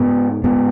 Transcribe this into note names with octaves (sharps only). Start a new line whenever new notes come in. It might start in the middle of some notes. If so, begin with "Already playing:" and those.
Already playing: G#2 B3
G#2 B3